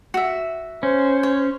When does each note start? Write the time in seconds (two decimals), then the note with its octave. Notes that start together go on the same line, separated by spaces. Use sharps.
0.14 F#4 E5
0.83 C#4 C5
1.23 C#5